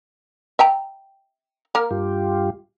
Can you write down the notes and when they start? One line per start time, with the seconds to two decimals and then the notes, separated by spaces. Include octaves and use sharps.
0.59 E5 G5 A#5
1.75 A#3 A#4
1.91 G2 F4 G4